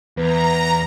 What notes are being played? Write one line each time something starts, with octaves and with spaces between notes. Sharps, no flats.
E2 B4 A#5